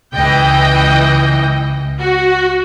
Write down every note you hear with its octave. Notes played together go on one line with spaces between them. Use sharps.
C#2 E3 D#5 G5
F#4